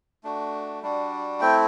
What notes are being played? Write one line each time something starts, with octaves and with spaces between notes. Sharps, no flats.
A3 D4 F#4
G3 D4 F#4
A3 C4 E4 G5